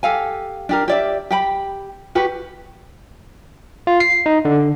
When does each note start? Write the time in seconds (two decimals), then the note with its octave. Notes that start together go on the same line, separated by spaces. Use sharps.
0.03 G4 A4 F5 G#5
0.69 D4 G4 A#4
0.88 G4 D5 E5
1.31 G4 G5 B5
2.15 F#4 G4 B4
3.87 F4
4.00 C7
4.26 D#4
4.45 D3